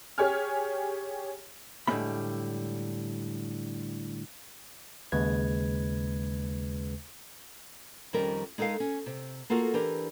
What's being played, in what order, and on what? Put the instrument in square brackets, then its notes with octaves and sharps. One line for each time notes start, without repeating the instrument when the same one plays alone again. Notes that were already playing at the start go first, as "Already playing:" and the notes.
[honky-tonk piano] G4 G#4 C#5 G#5 F6
[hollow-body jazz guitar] A2 D3 G3 G#3 A#3 B5
[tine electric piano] D#2 C#3 G#3 B4 G#6
[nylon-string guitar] F2 D#3 G3 C#4 A#4
G#3 D#4 A4 A#4 F5
C#4
C3
A#3 F4 F#4 A4 A#4
E3 D4 G4 A#4